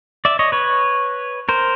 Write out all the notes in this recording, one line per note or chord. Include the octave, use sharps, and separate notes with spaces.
D5 E5
C#5 D#5
B4 C#5
A#4 C5